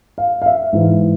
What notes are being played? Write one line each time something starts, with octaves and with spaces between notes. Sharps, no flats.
F5
F5
E5
G#2 E3